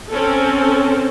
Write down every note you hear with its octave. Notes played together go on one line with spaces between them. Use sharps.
C4 C#4 A4